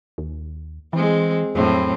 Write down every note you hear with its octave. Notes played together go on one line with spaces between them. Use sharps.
D#2
E3 G#3 C4
F2 A2 F#3 C4